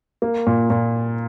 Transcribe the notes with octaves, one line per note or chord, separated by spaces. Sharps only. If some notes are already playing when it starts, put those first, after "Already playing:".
A#3
A#2
A#2